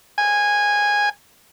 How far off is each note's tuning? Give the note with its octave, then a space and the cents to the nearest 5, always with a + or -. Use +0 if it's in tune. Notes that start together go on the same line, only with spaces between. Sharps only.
G#5 -15